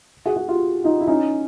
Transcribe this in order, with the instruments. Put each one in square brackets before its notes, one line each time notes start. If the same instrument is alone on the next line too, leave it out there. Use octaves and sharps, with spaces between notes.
[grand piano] F#4 G#4
F#4 G#4
F4 G4
D#4 F4
E4
C#4 D#4